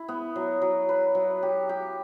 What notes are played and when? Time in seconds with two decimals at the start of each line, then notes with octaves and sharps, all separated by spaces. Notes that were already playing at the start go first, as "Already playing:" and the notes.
Already playing: E4
0.08 B3
0.36 F#3
0.62 F#3
0.89 B4
1.15 F#3
1.43 G4
1.69 G4